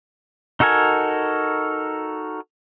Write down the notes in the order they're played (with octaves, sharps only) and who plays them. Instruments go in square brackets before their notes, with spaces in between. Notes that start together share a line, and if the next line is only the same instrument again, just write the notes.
[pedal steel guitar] D#4 F#4 A4 A#4 G#5